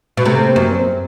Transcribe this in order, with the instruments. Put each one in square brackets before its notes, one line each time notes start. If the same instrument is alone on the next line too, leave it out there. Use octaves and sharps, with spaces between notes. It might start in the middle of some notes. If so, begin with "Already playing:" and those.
[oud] B2
[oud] C3 [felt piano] A3
[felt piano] A#3
[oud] F#2
[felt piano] C4